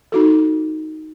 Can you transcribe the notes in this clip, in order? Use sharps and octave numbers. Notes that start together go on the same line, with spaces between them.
D#4 F#4 A4